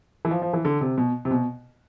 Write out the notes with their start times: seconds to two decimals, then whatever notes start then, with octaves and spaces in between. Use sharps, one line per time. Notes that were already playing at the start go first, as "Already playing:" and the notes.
0.25 E3
0.31 F3
0.42 F3
0.53 E3
0.65 D3
0.81 C3
0.98 B2
1.25 C3
1.31 B2